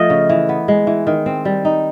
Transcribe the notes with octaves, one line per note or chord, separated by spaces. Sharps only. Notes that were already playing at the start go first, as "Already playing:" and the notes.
Already playing: F3 A3 D#5
C#3
E3
B3
G#3
E3
D#3
C4
G3
D#4